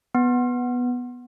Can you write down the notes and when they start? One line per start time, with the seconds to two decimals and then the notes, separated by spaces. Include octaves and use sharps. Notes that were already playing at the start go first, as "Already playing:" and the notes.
0.15 B3